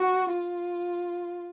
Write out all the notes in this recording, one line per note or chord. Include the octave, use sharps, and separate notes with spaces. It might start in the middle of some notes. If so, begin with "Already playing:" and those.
Already playing: F#4
F4